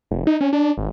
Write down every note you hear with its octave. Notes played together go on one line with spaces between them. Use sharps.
F1
D#4
C#4
D4
G#1